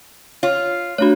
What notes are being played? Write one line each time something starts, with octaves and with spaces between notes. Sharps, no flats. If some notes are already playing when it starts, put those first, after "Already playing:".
F4 C#5
A3 D4 F#4 C#5